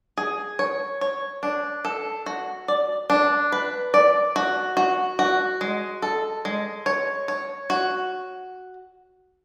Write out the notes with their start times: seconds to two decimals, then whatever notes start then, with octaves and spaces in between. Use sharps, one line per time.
0.17 G#4
0.59 C#5
1.01 C#5
1.43 D4
1.85 A4
2.26 F#4
2.68 D5
3.10 D4
3.52 B4
3.94 D5
4.36 F#4
4.77 F#4
5.19 F#4
5.61 G#3
6.02 A4
6.45 G#3
6.86 C#5
7.28 C#5
7.70 F#4